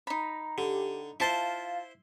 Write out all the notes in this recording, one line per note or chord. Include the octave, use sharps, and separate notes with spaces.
D#4 A#5 B5
D3 G4
E4 F4 C5 F5 A5